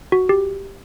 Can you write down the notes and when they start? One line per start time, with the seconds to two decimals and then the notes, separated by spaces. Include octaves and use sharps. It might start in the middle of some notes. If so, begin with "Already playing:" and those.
0.12 F#4
0.29 G4